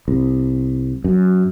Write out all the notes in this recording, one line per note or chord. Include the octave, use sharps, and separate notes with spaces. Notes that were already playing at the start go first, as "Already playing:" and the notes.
C2
F#2